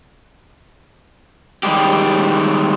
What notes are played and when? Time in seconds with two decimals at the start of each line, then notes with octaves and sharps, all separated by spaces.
1.63 D#3 G3 G#3 G4